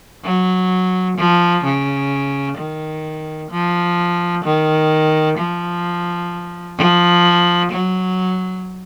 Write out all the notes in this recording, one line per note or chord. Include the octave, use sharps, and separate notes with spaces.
F#3
F3
C#3
D#3
F3
D#3
F3
F3
F#3